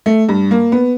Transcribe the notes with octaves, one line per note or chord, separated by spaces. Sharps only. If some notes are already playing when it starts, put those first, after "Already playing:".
A3
G2
A#3
B3